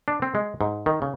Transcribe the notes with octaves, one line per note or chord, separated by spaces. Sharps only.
D4
C4
G#3
G#2
D#3
C#3